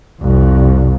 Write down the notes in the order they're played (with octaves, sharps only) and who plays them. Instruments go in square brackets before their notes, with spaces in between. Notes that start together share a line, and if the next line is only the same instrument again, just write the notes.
[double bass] C2 F2